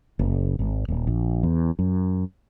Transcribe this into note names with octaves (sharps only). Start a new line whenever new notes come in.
F#1
G#1
D#1
A#1
E2
F#2